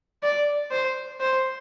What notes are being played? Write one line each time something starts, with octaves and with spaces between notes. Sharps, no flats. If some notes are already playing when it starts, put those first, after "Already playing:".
D5
C5
C5